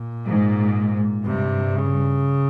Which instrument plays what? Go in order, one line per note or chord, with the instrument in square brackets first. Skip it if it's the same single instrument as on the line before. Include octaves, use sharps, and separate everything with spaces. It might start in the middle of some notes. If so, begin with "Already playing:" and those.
Already playing: [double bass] A#2
[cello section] G#2
[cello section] G2 [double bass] C3
[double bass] C#3